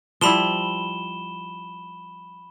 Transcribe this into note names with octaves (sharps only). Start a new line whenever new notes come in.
F3 G3 E4 B5 E7 G7